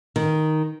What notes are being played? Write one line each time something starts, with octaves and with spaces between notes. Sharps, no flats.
D#3